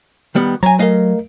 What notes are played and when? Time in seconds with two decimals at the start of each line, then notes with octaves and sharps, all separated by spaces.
0.35 D#3 G3 B3
0.63 F#3 C#5 G#5 A#5
0.79 A3 A#4 D#5 F5